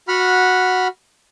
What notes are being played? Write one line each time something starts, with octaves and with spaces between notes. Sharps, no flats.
F#4 F#5 B5 F6